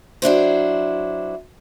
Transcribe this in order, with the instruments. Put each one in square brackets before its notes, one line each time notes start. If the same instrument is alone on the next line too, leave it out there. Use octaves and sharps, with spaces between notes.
[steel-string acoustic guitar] F#3 D4 E4 C5